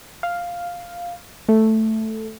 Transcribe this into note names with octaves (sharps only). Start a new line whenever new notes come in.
F5
A3